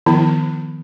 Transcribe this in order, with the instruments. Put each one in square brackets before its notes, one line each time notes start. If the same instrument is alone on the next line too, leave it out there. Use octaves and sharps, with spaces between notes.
[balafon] D#3 F3 B3 E4